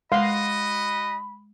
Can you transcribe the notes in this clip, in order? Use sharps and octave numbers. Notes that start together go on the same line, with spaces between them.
G#3 F#4 D#5 F5 F#5 B5 C6